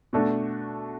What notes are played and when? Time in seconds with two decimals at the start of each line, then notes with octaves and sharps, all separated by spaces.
0.13 B2 A3 D4 F#4 A4